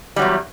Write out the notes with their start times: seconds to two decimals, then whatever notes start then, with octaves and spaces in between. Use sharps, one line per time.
0.16 G3
0.19 F#3
0.22 E2